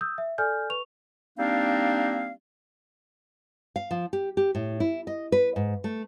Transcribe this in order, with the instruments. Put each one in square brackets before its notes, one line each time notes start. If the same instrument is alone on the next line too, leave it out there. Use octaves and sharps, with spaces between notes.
[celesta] D#6 E6 G6
E5
A4 D5 G#5 F6 G6
B4 C#6 F7
[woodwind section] G3 A#3 C4 D4 D#4 F5
[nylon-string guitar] F5
F3
G4
G4
A2
E4
D#5
B4
G#2
A3